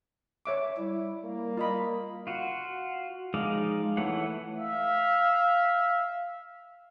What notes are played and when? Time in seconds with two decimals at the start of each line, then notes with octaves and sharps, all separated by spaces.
0.45 C#5 E5 D6
0.77 G3 E4
1.24 A#3
1.57 F4 D#5 B5
2.27 F4 F#4
3.34 F3 G#3 D#4 D5 F5
3.97 E3 A3 C#5 F#5
4.57 E5 F5